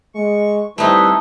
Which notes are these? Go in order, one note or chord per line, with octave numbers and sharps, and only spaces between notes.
G#3 C#6
G3 A3 C4 D#4 E4 B4